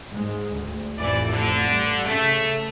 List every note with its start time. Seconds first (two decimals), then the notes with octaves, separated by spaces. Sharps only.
0.10 G#2 G#3
0.53 D2
0.98 A1 F2 E3 A3 D5
1.30 D3
1.71 G2
2.05 C#3 A3